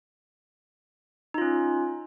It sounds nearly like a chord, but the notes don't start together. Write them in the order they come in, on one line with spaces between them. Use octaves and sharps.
D#4 F4 C#4